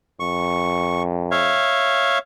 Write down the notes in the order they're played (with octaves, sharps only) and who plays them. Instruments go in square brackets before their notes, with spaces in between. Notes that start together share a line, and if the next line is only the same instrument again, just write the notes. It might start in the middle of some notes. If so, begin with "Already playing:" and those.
[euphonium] F2 [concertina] C#6
[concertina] C#5 E5 F5